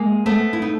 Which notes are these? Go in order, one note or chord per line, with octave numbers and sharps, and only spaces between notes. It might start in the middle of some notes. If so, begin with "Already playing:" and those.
Already playing: G#3 A#3
A3 B3
E4
D#4